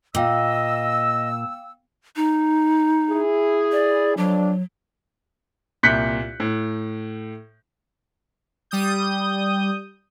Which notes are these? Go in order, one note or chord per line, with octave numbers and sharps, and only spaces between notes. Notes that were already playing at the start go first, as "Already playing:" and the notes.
A#2 D#5 F5 G5 D6 E6
D#4
E4 G#4
D5
F2 F#3 D4
C2 A#2 F#6 G6 B6 C#7
A2
G3 D#6 G6